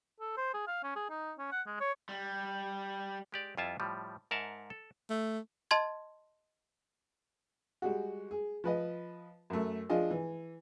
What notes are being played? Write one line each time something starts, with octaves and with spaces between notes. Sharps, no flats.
A4
C5
G#4
F5
C#4
G#4
D#4
C#4
F#5
G#3
C#5
G3
G#3 G4 D5
F2 G3 E4 F4 E5 A5
A2 F3 G3
G#2 A#4 E5 F#5 A5
A4
A3
D#5 A5 C6 G#6
G3 G#3 F#4
G#4
F3 B4 D#5
F#2 A3
F3 D4 F4 G#4 D#5
E3